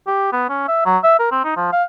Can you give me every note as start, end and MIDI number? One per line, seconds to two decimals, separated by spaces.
0.07 0.32 67
0.32 0.46 59
0.49 0.66 61
0.68 0.83 76
0.86 0.98 54
1.04 1.17 76
1.19 1.28 70
1.32 1.43 60
1.44 1.53 63
1.57 1.72 53
1.73 1.83 77